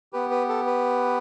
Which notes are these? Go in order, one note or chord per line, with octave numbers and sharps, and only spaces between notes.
B3 G4 B4
B4
A4
B4